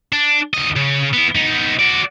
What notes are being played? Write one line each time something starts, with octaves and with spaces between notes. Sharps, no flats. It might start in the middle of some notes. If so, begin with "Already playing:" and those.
D4
D2 D#5
C#3
B3 E4
B3 D#4
F#4 D5